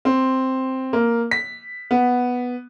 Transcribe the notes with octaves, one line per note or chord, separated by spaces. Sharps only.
C4
A#3
B6
B3